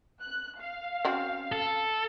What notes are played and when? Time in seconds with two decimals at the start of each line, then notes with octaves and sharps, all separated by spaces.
0.22 F#6
0.59 F5
1.05 C4 C#4 F#4
1.52 A4